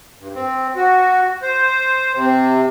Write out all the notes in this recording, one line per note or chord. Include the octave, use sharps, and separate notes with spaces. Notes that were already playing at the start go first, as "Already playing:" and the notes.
G2
C4
F#4
C5
C3